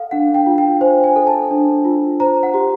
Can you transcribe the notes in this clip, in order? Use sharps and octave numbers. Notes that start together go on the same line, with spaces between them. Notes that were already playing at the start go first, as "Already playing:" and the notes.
Already playing: A4 F5 F#5
D4 F#5
G5
F4
G5
C5 G#5
G#5
A4
A5
D4
F4
C5 A#5
F#5
G4